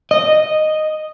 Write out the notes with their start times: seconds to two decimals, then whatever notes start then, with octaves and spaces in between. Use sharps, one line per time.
0.11 D#5